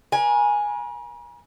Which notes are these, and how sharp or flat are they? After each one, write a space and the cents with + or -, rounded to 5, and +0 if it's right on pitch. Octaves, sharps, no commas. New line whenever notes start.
A#4 +45 G#5 +0